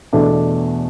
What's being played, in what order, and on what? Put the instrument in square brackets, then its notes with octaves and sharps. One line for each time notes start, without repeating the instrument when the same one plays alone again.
[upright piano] E2 B2 A3 D4